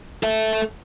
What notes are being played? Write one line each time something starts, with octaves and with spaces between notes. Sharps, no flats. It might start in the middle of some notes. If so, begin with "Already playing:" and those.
A4 E5